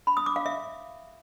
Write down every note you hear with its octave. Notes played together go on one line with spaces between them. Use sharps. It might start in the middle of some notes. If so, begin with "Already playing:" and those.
B5
D#6
D6
F5
E5